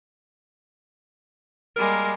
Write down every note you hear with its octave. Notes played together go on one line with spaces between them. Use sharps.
G3 G#3 A#3 A#4